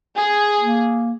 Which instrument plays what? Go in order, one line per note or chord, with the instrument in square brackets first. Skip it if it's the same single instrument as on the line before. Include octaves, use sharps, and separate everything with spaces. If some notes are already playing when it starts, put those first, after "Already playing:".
[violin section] G#4
[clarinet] A#3